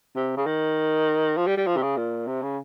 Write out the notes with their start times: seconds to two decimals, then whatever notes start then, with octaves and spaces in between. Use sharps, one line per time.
0.16 C3
0.37 C#3
0.46 D#3
1.37 F3
1.47 G3
1.57 G3
1.67 F3
1.77 C3
1.82 C#3
1.97 A#2
2.27 C3
2.42 C#3